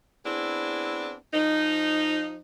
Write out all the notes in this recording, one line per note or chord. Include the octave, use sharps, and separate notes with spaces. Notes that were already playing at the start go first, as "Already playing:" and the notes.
B3 C4 D4 E4 G#4
F3 D#4